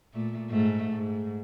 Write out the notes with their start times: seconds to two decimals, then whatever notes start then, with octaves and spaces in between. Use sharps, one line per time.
0.14 A#2 A3
0.50 G#2 A3
0.93 G#2